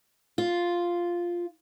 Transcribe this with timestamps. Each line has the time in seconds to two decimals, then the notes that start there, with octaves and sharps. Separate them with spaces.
0.38 F4